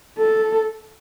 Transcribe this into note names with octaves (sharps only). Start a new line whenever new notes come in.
A4